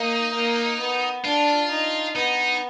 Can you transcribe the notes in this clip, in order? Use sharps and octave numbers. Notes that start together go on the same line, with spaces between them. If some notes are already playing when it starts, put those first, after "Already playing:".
Already playing: A#3 D#4
A#3
B3
D4 F4
D#4
B3 D#4